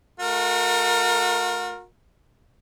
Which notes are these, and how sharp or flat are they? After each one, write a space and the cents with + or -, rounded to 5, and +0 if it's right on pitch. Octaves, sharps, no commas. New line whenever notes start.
A3 -15 F#4 -45 A#4 +0